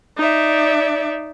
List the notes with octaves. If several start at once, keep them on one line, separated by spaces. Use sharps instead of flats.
D#4 D5 E5